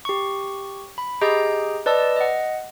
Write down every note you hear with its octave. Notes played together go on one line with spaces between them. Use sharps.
G4 C#6
B5
G4 G#4 D#5 A#5 G6 D7
B4 D5 D#5 A5 E6
D#5 F#5